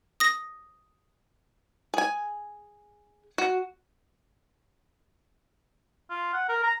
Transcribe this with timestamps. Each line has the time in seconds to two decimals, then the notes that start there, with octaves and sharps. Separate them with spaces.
0.20 D#6 A#6
1.94 G#4 G#5
3.38 F#4
6.10 F4
6.34 F#5
6.49 A#4
6.63 A#5